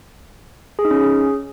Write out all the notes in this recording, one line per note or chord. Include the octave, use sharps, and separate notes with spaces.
G#4
D#4
C#4
G#4